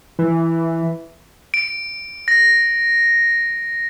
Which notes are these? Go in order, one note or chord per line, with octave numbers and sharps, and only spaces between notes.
E3
D7
A#6